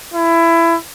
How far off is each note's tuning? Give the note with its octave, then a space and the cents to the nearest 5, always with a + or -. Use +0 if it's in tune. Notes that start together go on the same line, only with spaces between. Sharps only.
E4 +20